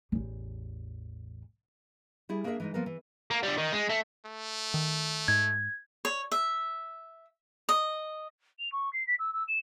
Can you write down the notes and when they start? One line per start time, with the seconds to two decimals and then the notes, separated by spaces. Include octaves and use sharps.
0.12 A1 E2
2.29 G3 E4 G#4
2.44 A#3 D4 G#4 A#4 C5 E5
2.60 E3 G#3 D#4
2.74 F3 A#3 B3 A#4
2.86 E3
3.30 A#3
3.43 D3 G3
3.57 D#3
3.72 G#3
3.89 A3
4.25 A3
4.74 D#3
5.28 G#2 G#6
6.05 C#5
6.32 E5
7.69 D#5
8.59 F7
8.72 C#6
8.93 C7
9.07 B6
9.19 E6
9.33 E6
9.48 E7